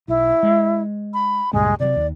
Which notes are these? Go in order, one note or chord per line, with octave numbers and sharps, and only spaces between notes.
B1 E4
G#3
B5
C#2 G2 A#2 G#3
C3 D#3 F#3 D5
D#2